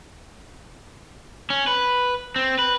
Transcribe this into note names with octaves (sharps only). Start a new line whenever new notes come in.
C#4
B4
C4
B4